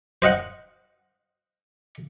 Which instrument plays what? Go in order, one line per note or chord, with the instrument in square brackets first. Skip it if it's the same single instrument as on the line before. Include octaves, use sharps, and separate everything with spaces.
[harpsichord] C5 D#5 F5 F#5